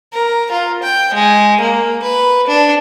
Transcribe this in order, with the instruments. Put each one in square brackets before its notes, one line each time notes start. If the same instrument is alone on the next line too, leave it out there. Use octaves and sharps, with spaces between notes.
[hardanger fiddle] A#4
F4
G5
G#3
A#3
B4
D4